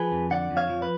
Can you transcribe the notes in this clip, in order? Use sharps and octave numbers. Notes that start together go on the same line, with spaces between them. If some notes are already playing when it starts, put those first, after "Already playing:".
Already playing: F3 G#4 B4
F2
D3 D5 F#5
F2
C#5 F5
F3
B4